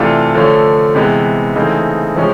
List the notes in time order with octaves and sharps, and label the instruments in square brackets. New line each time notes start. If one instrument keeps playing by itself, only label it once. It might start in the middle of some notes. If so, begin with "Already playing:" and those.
Already playing: [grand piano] C3 E3 A3 D4 F4
D3 F3 A3 C#4
C3 E3 G#3 B3
C#3 E3 A3 C4 D#4
C3 F3 G#3 C#4